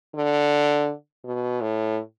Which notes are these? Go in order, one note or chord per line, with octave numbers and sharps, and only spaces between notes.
D3
B2
A2